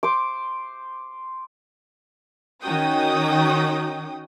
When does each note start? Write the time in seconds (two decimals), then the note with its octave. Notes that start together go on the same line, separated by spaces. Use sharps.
0.03 C5 D6
2.63 D#3 C#4 D#4 F#4 G5 D#6